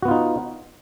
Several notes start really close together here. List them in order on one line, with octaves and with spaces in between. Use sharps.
F#4 B3 F4 D#4